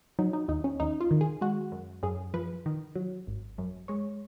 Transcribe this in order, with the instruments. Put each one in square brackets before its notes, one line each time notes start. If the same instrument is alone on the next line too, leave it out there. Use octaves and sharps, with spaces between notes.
[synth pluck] F#3 D#4
D#4
D#2 D#4
C#4
D#2 D#4
F4
D#3
G#4
G#3 F#4
F#2
F#2 G#4
F3 B4
D#3
F#3
G#1
F#2
G#3 C#5